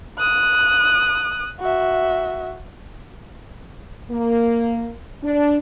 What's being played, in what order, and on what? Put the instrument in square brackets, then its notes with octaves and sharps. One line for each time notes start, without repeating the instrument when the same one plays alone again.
[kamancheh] D#6 F#6
F#4 E5
[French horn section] A#3
D4